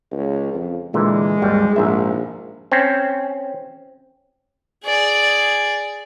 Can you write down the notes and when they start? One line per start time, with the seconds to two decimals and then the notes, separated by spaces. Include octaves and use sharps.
0.11 C#2
0.54 F2
0.94 A#2 D3 E3 G#3
1.42 G#1 D#2 G3
1.76 A#1 G#2 E5
2.72 C4 C#4
4.85 G#4 D5